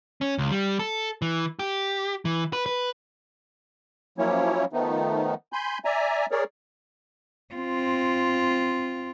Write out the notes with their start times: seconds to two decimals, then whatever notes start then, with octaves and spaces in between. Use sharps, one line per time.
0.21 C#4
0.38 C#2
0.51 G3
0.79 A4
1.22 E3
1.59 G4
2.25 E3
2.53 B4
2.66 B4
4.18 F3 F#3 A#3 C#4 E4 C#5
4.73 D#3 F3 A3 B3 D#4
5.53 G#5 B5 C6 G6
5.85 D5 E5 G#5 A#5
6.31 G#4 A#4 C#5 D5
7.54 C4 F4